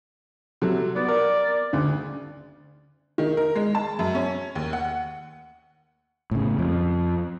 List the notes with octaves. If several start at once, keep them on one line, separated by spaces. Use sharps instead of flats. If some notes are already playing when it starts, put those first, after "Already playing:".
C3 F#3 A4
B3 D5
A#4
D2 C#3
D#3
A#4
G#3
A5
F#2
C#4
D#2
F#5
A2 C#3
F2